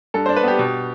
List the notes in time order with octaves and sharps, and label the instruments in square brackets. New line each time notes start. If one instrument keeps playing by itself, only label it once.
[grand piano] G2 A4
D4 C5
B4
B3 G4
B2